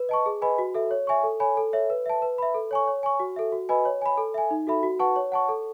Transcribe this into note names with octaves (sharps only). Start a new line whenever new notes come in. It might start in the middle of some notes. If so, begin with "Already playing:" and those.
Already playing: B4
D#5 A5 C#6
G#4
B4 D#5 G#5 B5
F#4
A4 E5
C#5
E5 G#5 C#6
A4
C#5 G#5 B5
A4
C#5 E5
B4
E5 A5
B4
E5 B5
A4
C#5 G#5 C#6
C#5
G#5 C#6
F#4
A4 E5
F#4
B4 D#5 G#5 B5
C#5
G#5 B5
A4
E5 G#5
D#4
F#4 A4 E5 B5
F#4
B4 F#5 A5 C#6
C#5
F#5 A5 C#6
A4